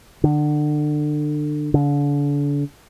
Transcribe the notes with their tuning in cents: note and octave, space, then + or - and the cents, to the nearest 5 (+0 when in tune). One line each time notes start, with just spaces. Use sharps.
D3 +30
D3 -40